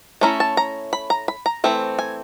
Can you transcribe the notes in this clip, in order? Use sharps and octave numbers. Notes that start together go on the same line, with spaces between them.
A3 C#4 E4 A#5
A5
A#5
B5
A#5
B5
A#5
E3 A3 C4
G#5